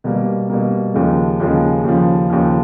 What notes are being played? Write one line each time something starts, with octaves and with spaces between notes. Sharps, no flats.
B2 G3 A#3
B2 G3 A#3
D#2 C#3 F3 G#3
D#2 C#3 F3 G#3
D#2 C#3 F3
D#2 C#3 F3